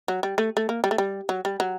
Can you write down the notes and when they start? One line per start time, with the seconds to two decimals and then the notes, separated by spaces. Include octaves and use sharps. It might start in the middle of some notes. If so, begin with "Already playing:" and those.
0.08 F#3
0.23 G3
0.38 A3
0.57 A3
0.69 A#3
0.84 G3
0.91 A3
0.98 G3
1.29 F#3
1.45 G3
1.60 F#3